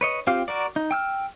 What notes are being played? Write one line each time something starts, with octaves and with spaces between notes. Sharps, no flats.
B4 C#5 D#5
C4 F4 G4 F5 F6
F#4 A#4 D5
D#4
G5 E6 F6